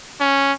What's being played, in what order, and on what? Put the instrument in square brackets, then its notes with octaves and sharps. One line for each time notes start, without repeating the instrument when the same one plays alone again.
[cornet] C#4